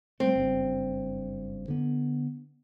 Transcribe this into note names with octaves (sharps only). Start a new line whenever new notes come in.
G3 A3 C4
F#1 G2
D3 B3